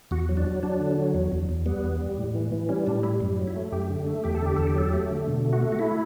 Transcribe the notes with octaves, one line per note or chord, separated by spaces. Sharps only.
E2 F#4
F#3
D4
F#3
F#3 D4
D3
F#3
E2
E2
E2
G3 B3
E2
G3
A2
E3
E3
G3 C#4
A2 D4
G3 E4
F#2
F#3
E4
A3
F#2 G4
D3
A3
E2 G4
A4
D3 G4
E2 A4
G4
F#3 A4
A3 G4
D3
B2
A3
F#4
A3
F#4
A3 E4